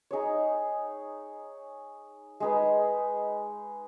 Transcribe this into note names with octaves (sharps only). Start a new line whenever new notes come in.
D#4 G#4 C#5
G#3 D#4 G#4 B4